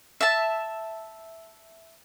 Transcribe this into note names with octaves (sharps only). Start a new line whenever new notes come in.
E5 A5